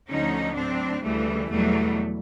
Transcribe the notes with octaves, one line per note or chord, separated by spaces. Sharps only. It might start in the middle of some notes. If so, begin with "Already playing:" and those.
D2 D3 F3 C#4 D#4
A2 F#3 C4 D4
D2 C#3 E3 G3 A3
E2 B2 F#3 G3 A3